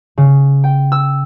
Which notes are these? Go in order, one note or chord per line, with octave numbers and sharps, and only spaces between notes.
C#3
G5
E6